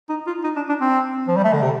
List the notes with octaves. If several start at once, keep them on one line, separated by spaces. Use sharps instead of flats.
D#4
F4
D#4
D4
D4
C4
F3
G3
A3
D3
C3